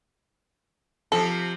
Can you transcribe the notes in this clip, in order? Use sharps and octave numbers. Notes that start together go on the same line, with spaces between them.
C3 F3 A4